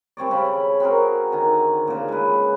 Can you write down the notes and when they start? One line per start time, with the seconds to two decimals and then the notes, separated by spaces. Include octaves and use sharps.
0.17 G3 C4 C#5 D5
0.31 C#3 C#4 B5
0.80 C4 F#4 G#4 A#4
1.32 D3 D#3 A#5
1.87 A#2 C#3
2.08 G#3 B4